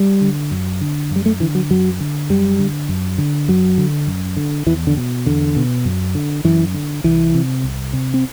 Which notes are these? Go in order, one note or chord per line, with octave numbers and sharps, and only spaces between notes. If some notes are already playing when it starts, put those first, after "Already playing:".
Already playing: G3
D3
F#2
D3
F#2 G3
A3
D3 E3
F#3
F#2 F#3
D3
F#2 G3
D3
F#2
D3
F#2 F#3
D3
F#2
D3
E2 E3
D3
B2
E2 D3
B2
F#2
D3
F#2 E3
D3
C2 E3
C3
C2
C3
C4